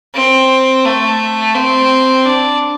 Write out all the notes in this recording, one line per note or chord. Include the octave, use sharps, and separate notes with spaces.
C4
A3
C4
D4